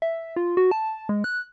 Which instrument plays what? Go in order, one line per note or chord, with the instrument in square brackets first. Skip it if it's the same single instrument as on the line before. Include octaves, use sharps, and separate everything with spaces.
[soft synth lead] E5
F4
F#4
A5
G#3
F#6